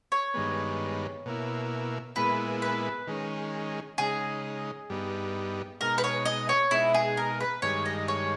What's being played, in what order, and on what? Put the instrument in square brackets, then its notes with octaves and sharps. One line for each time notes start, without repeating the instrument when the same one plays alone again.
[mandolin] C#5
[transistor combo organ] G2 D#3 G#3 B3
B2 A#3 E4
[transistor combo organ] A#2 G#3 B3 E4 [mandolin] B4
[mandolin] B4
[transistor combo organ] D#3 G#3 C#4
[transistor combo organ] C#3 G#3 D#4 [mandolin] G#4
[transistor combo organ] G2 G3 B3 D#4
[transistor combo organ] B2 G#3 D#4 [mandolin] A#4
[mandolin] B4
C#5
D#5
C#5
[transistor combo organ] B2 G#3 D#4 [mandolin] E4
[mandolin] G#4
A#4
B4
[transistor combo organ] G2 D#3 G#3 [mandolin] C#5
[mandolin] D#5
C#5